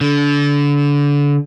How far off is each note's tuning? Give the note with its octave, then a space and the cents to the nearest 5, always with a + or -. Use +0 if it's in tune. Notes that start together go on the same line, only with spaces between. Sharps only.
D3 -30